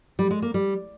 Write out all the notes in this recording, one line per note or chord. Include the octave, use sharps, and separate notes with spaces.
G3
G#3
A#3
G3